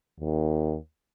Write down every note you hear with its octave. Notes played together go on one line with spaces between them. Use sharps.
D#2